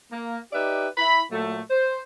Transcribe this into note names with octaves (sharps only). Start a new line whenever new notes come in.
A#3
D#4 G4 B4 D5 E5
E4 B5
A#2 F#3 A3
C5